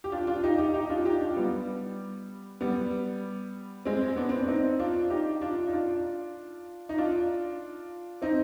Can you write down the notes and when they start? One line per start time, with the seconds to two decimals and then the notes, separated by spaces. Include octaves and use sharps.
0.04 G4
0.12 D4 F4
0.27 D4 F4
0.43 D#4 G4
0.58 D#4 G4
0.74 D#4 G4
0.85 D#4
0.89 D4 F4
1.05 D#4 G4
1.21 D4 F4
1.37 G3 B3
2.61 G3 B3
3.85 G#3 C4
4.16 B3 D4
4.29 C4
4.39 D4
4.48 C4 D#4
4.79 D4 F4
5.10 D#4 G4
5.42 D4 F4
5.67 D#4
5.72 D4 F4
6.89 D#4
6.98 D4 F4
8.22 C4 D#4